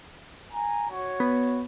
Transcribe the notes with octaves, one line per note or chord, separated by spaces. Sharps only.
G#5 A#5
F#4 C#5
B3